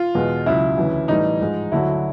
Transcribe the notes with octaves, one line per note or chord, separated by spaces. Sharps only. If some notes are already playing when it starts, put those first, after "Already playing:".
Already playing: F4
E2 B2 G#3
C#2 C#3 F#3 E4
D2 C#3 E3
A2 E3 G3 D#4
G#2 F3 G#3
D2 D3 F#3 E4